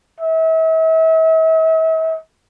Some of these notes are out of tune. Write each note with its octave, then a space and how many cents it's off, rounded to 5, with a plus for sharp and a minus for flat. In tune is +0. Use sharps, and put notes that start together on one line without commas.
E5 -40